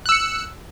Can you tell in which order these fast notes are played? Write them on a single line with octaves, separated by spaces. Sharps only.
F#6 E6 C#7